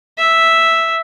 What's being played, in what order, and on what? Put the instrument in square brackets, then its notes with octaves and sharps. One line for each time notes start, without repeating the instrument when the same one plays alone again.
[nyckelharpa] E5